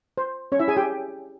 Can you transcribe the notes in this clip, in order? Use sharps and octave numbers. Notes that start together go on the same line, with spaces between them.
C5
C#4 C#5
E4 E5
G#4 G#5
G4 G5